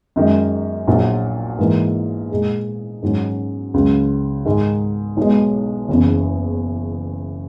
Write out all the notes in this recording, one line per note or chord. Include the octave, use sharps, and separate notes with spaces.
F#2 D#3 G#3
A#1 A#2 F#3
G#2 E3 A#3
A#2 G#3 D#4 G#4
G#2 D#3 F#3 C#4
C#2 C#3 F#3
G#2 D#3 G#3
B1 B2 G#3
F#1 E2 C#3